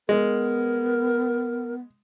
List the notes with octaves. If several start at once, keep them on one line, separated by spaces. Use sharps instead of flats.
G#3 B3 A#4